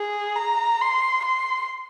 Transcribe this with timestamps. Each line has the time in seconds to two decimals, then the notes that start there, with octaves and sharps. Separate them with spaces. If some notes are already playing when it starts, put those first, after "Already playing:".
Already playing: G#4
0.36 A#5
0.81 C6
1.25 C6